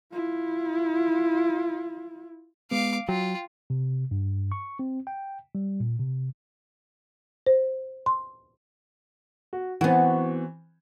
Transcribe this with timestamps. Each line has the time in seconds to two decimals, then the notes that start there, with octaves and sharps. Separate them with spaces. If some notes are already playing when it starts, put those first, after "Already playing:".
0.12 E4 F4
2.71 G#3 B3 F5 D6
3.09 F#3 F4 G5
3.70 C3
4.11 G2
4.52 C#6
4.79 C4
5.07 G5
5.55 G3
5.80 A#2
6.00 C3
7.47 C5
8.06 C6
9.53 F#4
9.81 E3 B3 C4 F#4